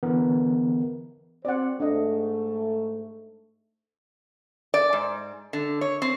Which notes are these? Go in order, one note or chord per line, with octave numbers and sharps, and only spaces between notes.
D3 E3 B3 A#4
C4 D5 F#5
G#2 A3 D4 D#5
D5
G#2
D3
C#5
C4